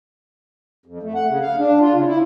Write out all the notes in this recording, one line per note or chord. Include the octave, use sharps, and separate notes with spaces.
F2
A3
F#5
C#3
F5
D4
F4
C#3
E4